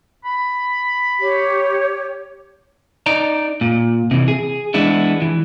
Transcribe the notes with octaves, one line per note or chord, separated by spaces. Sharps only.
B5
G4 C#5
D#4 D5 A#5
A#2
C3 E3
G#4
E3 G#3 B3 D4 E4
E3